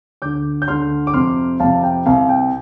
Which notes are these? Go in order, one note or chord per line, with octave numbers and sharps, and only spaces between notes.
D2 D3 D6 G6
G6
D2 D3 C6 F6
D6
F2 C3 C6 F6
F2 C3 F5 A5
G5
C2 C3 F5
G5